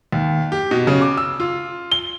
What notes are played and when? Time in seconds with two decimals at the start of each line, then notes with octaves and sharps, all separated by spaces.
0.12 D#2
0.52 G4
0.71 B2
0.87 C#3
1.02 D6
1.17 E6
1.40 F4
1.92 G7